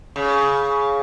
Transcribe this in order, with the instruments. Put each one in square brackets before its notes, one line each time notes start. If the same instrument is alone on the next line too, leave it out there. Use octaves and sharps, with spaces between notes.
[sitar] C#3